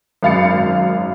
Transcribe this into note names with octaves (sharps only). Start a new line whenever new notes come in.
G#1 F#2 F5 B5 A6 C#7